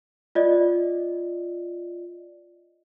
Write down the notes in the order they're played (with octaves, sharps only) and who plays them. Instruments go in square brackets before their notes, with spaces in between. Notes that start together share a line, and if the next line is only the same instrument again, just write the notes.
[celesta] F4 D5 D#5